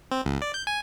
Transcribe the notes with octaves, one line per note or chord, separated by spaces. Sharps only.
C4
C#2
D5
G6
G#5